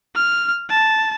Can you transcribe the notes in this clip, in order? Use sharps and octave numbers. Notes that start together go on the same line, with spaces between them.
F6
A5